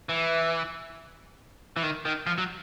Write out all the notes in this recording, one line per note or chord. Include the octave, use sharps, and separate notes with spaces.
E3
E3
D#3
D#3
F3
F#3